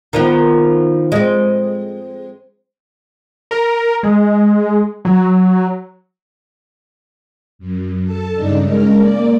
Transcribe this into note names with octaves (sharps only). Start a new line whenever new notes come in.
D#3 F3 B3
G#3 C4
A#4
G#3
F#3
F#2
A4 A5
G2 C#3 D4 D#4
G#3 C#4 A#4
A#3 D5